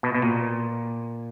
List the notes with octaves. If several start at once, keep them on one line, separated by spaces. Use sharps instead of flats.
B2
B2
A#2